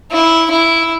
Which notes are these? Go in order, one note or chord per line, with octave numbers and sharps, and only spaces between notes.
E4
E4